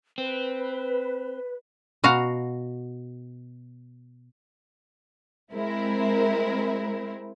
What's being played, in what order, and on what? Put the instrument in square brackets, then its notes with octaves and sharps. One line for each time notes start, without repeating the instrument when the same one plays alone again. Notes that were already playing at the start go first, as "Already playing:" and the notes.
[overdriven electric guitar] C4 [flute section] B4
[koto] B2 F#4 F5 A#5
[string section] G#3 C4 E4 A#4